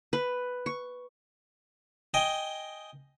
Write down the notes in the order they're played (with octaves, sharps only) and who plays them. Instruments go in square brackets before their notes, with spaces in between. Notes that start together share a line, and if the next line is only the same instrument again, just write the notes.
[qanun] B4
C#6
[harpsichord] D#5 G5 G#5